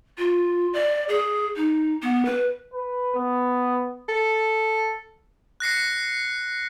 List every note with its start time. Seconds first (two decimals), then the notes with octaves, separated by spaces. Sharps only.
0.18 F4
0.73 D5
1.09 G#4
1.56 D#4
2.03 B3
2.25 B4
2.73 B4
3.15 B3
4.09 A4
5.60 F#6 A#6 C7 C#7